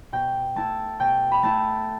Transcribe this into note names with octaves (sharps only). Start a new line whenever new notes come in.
B2 G5
A3 E4 A5
B2 G5
B5
A3 E4 A5